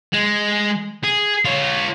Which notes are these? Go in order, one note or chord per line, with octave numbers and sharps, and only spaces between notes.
G#3
G#4
F4 C#5